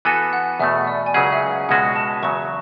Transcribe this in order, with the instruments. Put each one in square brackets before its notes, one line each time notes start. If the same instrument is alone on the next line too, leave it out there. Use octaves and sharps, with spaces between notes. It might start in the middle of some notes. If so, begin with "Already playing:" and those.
[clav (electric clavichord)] E3 B3 F#4 A4 [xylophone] G#5
[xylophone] F#5
[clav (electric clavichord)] E2 B2 A3 [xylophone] E5
[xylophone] D5
G#5
[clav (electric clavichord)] C#2 C#3 F#3 C#4 G#4 [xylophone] F#5
[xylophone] E5
F#5
[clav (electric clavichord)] C#2 B2 G#3 C#4 F#4 [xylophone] F#5
[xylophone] A5
[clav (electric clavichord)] E2 C#3 F#3 [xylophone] C#6